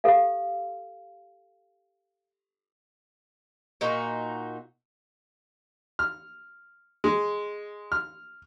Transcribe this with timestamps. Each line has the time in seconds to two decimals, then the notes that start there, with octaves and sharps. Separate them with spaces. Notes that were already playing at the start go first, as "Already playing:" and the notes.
0.04 G4 A4 F5
3.81 A#2 D#4 F#4
5.99 F6
7.04 G#3
7.92 F6